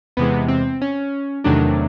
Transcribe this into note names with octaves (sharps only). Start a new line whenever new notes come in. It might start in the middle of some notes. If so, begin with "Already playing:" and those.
E2 C3 E3 G#3 B3
C4
C#4
E2 C3 D#3 F#3 A3 D4